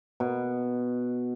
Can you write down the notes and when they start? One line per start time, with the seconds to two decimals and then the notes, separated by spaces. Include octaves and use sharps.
0.20 B2